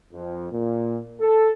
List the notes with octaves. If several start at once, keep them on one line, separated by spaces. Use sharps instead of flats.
F2
A#2
A4